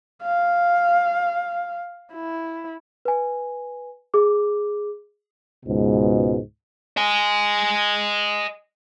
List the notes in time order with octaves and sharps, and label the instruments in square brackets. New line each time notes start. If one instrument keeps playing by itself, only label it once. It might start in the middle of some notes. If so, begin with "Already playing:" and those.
[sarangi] F5
E4
[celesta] B4 G#5
G#4 D6
[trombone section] C#2 G#2 B2
[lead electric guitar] D#5 G#5